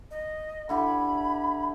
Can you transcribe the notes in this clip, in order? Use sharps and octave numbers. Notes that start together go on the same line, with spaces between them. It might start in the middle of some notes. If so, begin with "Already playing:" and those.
D#5
D3 E4 G4 B5